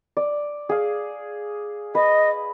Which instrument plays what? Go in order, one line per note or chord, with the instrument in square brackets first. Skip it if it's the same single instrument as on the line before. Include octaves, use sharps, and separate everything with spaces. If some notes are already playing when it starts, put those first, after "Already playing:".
[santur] D5
G#4 F5
[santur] B4 [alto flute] D#5